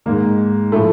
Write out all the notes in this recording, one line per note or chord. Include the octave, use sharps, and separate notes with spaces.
G#2 D#3 A#3
A2 F3 A3